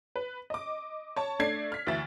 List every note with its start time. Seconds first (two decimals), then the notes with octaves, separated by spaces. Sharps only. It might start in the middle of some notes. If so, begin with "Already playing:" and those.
0.16 B4
0.50 D#5 D6
1.16 C#5 A5
1.39 A3 D4 D5 G#6 C7
1.72 F6 B6
1.87 D2 E3 E5 A6